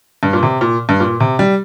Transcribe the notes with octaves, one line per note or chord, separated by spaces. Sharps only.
G2
A#2
C3
A#2
G2
A#2
C3
G3